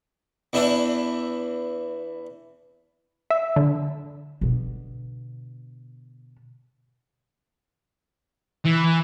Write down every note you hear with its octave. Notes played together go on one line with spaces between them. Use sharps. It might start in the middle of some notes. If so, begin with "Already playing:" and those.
E2 E3 D4 E4
E5
D3
B2 D3
E3